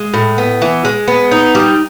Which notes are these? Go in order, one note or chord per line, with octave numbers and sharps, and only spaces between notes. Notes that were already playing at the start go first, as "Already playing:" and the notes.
Already playing: G#3
A2
B3
E3
G#3
B3
D#4
G3